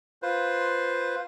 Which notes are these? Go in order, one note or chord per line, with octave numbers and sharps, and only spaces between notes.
F4 B4 C5